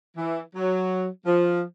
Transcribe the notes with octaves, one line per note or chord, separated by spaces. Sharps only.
E3
F#3
F3